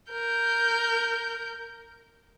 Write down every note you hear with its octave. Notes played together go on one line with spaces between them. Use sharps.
A#4 G6